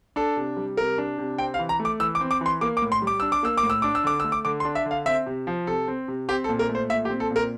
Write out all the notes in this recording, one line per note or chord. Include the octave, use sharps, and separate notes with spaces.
D4 A4
C3
G3
C3 A#4
D4
C3
C4 G5
F5
E3
A#5
A3
D6
E3 E6
D6
C4
D6
E3 C6
A#3 D6
D6
A2
C6
G3
D6
D4 E6
D6
A#3 E6
D6
A2
E6
D4 D6
E6
D3 D6
A3 E6
D6
D3 D6
C6
D4
E5
D3
F5
C4 E5
C3
F3
C3 A4
C4
C3
C4 G4
A4
A#2
A#4
A3
C5
A#2 E5
G4
C4
A4
A#2
A#4